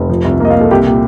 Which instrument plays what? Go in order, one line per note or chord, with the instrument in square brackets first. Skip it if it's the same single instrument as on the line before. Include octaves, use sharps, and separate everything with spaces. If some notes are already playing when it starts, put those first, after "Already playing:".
Already playing: [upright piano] F1
F3
C2
A#3 D#5
F5
A#3
A4
C2 G4
A#2 G4